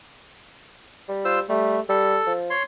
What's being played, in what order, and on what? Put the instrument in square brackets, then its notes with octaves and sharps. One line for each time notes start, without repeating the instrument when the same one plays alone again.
[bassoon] G3
[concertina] F4 C5 E6
[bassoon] G3 [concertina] A3
[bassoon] G3 [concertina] A4
[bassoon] F3
[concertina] C#5 C6